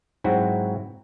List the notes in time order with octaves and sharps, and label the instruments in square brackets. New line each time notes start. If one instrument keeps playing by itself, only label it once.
[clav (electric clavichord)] G#2 F#3 C4 E4 F#4